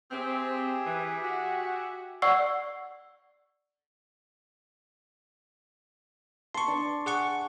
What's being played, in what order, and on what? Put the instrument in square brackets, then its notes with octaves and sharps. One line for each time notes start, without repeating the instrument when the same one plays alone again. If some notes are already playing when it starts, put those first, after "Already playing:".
[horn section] C4 [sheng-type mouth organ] G4 G#4 E5
[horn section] E3
F#4
[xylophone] D5 F#5 C#6 E6 C7
[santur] A5 [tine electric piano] C6 C#6
[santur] D4
[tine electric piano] G#4 F#5 C#6